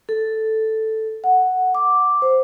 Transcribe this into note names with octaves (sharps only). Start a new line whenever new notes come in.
A4
F#5
D6
C5